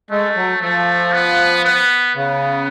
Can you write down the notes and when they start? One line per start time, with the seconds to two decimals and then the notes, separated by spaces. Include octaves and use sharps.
0.11 G#3 A3
0.36 F#3
0.61 F3 A3
1.13 B3
1.64 B3
2.15 C#3 B3